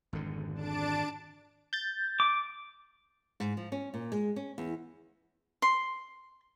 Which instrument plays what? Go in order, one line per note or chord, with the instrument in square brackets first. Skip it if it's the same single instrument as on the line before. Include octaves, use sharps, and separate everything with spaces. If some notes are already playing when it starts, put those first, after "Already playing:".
[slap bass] G#1 F2 D3
[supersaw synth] D4 A5 D7
[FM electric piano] G6 A6
[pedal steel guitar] D6
[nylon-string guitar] G#2
F3
C#4
A#2
G#3
C#4
E2
[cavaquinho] C6